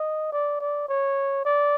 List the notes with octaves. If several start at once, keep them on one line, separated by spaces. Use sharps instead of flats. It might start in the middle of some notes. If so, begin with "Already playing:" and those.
Already playing: D#5
D5
D5
C#5
D5